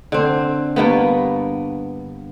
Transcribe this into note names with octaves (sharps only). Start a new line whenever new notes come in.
D3 C4
G2 A#3 B3